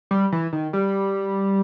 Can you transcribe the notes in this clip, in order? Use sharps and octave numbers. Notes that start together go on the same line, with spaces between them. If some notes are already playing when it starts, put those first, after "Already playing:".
G3
E3
D#3
G3